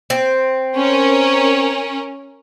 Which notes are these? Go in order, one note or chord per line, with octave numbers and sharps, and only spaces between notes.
C4
C#4 A#4